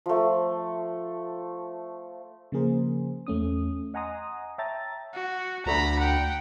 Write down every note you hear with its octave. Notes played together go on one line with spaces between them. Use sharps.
F3 A3
C#3 F3 A#3 G#4 A#4 C5
E2 A3 C#4 D#6
D#5 F#5 G#5 A#5 C6 D#6
C#5 E5 G5 A5 A#5 A6
F#4
D2 A#5 B5
F#5 G5